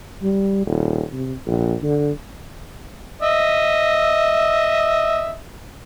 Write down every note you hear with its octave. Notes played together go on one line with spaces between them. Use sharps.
G3
D#1
C3
A#1
D3
D#5 E5